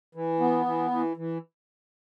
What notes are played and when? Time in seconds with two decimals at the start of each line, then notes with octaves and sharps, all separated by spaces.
0.15 E3
0.40 B3
0.66 E3
0.91 E3
1.17 E3